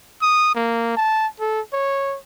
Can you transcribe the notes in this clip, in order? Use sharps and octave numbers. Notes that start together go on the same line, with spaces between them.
D#6
A#3
A5
A4
C#5